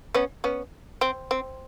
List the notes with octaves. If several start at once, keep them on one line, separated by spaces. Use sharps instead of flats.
B3 C#4
B3 C#4
C4
C4